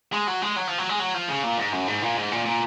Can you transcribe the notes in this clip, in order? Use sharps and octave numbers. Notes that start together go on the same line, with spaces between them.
G#3
F#3
G#3
F#3
F3
F#3
G#3
F#3
F3
C#3
A#2
G#2
F#2
G#2
A#2
G#2
A#2
A#2